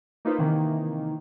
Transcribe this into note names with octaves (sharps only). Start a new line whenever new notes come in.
A#3 D#4 F4 B4 C5
C3 D#3 E3 A#3